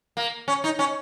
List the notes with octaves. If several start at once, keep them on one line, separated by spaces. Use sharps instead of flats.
A#3
C#4
D#4
C#4